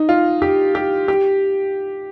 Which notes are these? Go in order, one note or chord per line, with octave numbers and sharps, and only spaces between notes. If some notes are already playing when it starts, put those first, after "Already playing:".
Already playing: D#4
F4
G4
G4
G4